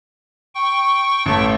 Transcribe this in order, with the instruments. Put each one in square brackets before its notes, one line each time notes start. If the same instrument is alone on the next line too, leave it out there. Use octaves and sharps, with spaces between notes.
[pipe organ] G5 C#6
[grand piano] A1 A3